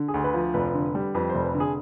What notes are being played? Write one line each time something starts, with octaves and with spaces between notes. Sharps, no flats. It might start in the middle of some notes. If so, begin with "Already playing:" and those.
Already playing: D3
G#4
D2
B4
F3
F1 B4
D3
G3
F2 B4
C5
F1
B4
D3
G#4